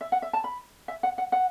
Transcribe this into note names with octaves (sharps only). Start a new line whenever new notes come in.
E5
F#5
E5
A5
B5
E5
F#5
F#5
F#5